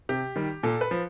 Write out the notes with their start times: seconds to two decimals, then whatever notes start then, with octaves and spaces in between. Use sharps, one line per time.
0.09 C3 G4
0.36 D#3 G3
0.63 A#2 A4
0.81 B4
0.91 F3